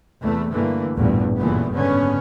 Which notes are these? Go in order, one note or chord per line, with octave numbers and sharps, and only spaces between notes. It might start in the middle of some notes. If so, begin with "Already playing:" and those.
E2 C3 A3
G2 D3 E3 A3 A#3
A1 E2 G2 A#2 G3
F#1 A#2 E3 G3 A3 B3
F#1 G#2 D3 B3 C#4